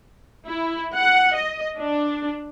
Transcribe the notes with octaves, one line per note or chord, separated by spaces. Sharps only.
E4
F#5
D#5
D4